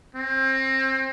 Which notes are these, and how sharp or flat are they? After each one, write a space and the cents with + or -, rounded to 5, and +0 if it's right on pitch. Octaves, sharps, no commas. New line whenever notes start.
C4 +30